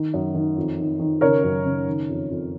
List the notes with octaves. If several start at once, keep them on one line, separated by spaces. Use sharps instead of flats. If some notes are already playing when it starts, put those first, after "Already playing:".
Already playing: D#3
F#2
D#3
F2
D#3
D#3
C#3 A#4 C#5
F#2
C#3
D#3
F2
F2